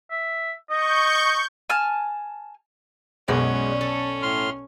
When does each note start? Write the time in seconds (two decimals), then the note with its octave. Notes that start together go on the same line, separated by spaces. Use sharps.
0.11 E5
0.70 D#5 C#6 G6
1.70 G#5 A5 F6
3.28 B1 F#2 G#3 B3 C#4 F#4 D5
3.81 A4
4.23 A2 C6 F6